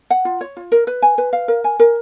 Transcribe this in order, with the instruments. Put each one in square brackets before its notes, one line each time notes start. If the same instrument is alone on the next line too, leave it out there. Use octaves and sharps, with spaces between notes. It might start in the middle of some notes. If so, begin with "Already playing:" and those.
[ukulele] F#5
F4
C#5
F4
A#4
B4
G#5
B4
F5
A#4
G#5
A#4